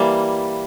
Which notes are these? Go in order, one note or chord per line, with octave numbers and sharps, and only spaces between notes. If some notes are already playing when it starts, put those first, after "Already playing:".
Already playing: E3 G3 A#3